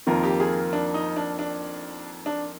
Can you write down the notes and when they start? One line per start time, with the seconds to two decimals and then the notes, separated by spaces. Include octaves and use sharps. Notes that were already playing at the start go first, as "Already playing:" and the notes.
0.07 F2 D#3 A#3 F4 A#4
0.23 G4
0.40 G#4
0.73 D4
0.94 D#4
1.16 D4
1.39 D4
2.26 D4